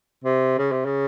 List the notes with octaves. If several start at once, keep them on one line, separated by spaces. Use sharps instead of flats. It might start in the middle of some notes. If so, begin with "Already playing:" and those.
C3
C#3
C3
C#3